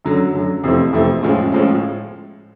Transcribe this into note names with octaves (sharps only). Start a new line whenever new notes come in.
F#2 D3 F#3
F#2 D3 F#3
F2 C3 E3 A3 C4
F2 C3 E3 A3 C4
A2 F3 G#3 C#4
A2 F3 G#3 C#4